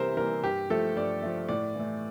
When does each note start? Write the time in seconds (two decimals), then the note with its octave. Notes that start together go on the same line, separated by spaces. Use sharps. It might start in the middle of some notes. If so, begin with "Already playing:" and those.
Already playing: C3 E3 G3 A#3 A#4 C5 E5
0.17 E3 G3 A#3 A#4
0.43 G2 G4
0.70 F3 A3 A4
0.97 G2 D5
1.22 F3 A3
1.49 A2 D5
1.75 E3 A3